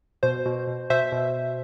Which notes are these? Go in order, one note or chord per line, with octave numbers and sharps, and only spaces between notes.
B2 C5
B2
B2
B2 C5 E5
B2